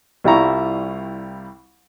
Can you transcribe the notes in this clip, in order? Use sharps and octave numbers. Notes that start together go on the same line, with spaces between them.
C2 G3 E4 F4 A#5 C#6